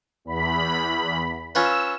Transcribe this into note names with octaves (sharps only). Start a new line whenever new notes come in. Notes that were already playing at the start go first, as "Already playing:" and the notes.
E2 B5
C#4 F4 B4 E6